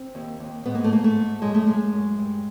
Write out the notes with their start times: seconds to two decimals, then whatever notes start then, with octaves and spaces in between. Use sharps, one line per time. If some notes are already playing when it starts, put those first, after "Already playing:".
Already playing: C4
0.15 D#2
0.40 D#2
0.66 G#2 B3
0.75 A#3
0.84 A3
0.91 G#2 A#3
1.04 A3
1.16 G#2
1.42 F#2 G#3
1.55 A3
1.66 F#2 G#3
1.93 F#2
2.18 G2